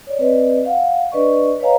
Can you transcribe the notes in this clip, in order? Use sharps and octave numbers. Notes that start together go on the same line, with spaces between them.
C#5 D5
C4 B4 D5 D#5
F5 F#5
D4 B4 D5 D#5 C#6
B4 C#5 D#5 F5 G#5 A#5